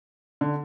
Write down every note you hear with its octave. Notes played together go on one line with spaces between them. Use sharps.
D3